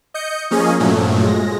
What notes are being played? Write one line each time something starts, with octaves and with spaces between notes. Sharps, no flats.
D#5 G6 C#7
F3 A#3 C#4 G#4 D#5
G2 A#2 F3 F#3 A3
G#3 A#6